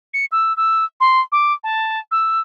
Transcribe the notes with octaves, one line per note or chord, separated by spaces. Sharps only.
C#7
E6
E6
C6
D6
A5
E6